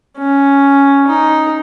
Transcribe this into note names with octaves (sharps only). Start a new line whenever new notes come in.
C#4
D#4